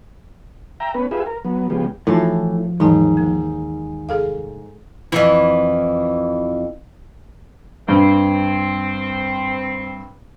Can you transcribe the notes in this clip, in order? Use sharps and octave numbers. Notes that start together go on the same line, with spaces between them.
E5 G5 A#5
B3 C#4 B4
F4 G4 G#4 B4 E5
A#4
F#3 B3
C#3 F3 G#3 B3 G4
A2 E3 F3 D#4 F4 F#4 A5
D#2 G#2 E3 F#3 A5
A#3
F1 G#4 A4 F5
F2 E3
G2 C4